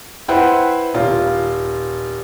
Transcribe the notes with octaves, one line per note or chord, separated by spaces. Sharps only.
E4 B4 C5 E5 F#5 G5
D#1 F4